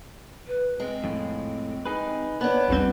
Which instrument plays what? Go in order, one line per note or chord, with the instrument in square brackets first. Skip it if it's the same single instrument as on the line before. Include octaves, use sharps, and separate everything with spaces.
[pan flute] B4
[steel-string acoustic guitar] G#3 [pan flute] C4
[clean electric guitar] F2 A2
D#4 G#4 B4
[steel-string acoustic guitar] B3 D4 [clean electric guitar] B4 [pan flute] C#5
[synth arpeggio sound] A#1 E2 C4 [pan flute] G3